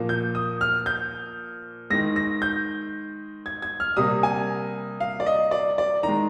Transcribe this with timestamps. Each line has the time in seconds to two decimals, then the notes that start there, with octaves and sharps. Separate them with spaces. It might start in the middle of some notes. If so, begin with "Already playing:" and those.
Already playing: A#2 F3 A#3
0.09 G6
0.35 D#6
0.61 F6
0.86 G6
1.90 D#3 G#3 A#6
2.16 A#6
2.42 G6
3.46 G#6
3.62 G#6
3.80 F6
3.96 C3 G3 A#3 D#6
4.23 G#5
5.00 F5
5.20 D5
5.26 D#5
5.51 D5
5.78 D5
6.03 D#3 G#3 A#5